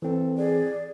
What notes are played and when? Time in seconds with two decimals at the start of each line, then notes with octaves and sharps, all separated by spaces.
0.02 E3 C4 A4
0.37 G#4 D5